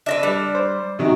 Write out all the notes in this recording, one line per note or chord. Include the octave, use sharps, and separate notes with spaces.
D4 B4 D#5 E5
G3
C5
C3 D#3 F#3 G#3